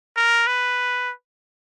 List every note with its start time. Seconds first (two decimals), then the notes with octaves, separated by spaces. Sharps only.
0.16 A#4
0.47 B4